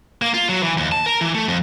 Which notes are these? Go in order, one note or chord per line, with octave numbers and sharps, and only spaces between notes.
A#3
F4
F#3
E3
D#2
A5
A#4
E3
A3
F2